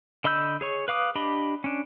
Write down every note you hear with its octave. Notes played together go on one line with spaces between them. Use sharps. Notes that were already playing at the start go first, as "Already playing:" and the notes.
D3 D#5 B5 E6 G6
G#4 C#5 C#6
B4 F5 D6 D#6
D4 G4 D#5 B5
C#4 D4